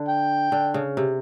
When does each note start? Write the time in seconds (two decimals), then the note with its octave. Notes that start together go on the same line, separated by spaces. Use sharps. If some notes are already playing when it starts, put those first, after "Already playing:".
Already playing: D3
0.08 G5
0.52 D3
0.74 C#3
0.97 C3